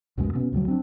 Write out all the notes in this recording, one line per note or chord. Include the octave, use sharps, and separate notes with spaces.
C#2 F#2 B2 G#3
B2 B3 C#4
D2 G2 D#3 F#3
C4 D4